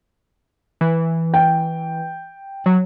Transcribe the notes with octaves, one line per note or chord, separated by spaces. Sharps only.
E3
G5
F#3